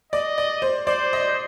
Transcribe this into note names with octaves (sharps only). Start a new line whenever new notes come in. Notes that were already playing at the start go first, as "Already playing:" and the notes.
D5 D#5
D5
C5
C5 D5
D#5